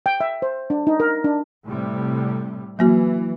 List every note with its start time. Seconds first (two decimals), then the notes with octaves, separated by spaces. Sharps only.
0.06 G5
0.20 E5
0.42 C5
0.70 D4
0.87 D#4
1.00 A#4
1.24 D4
1.66 A2 C3 G3
2.79 E3 F#3 A#3 F#4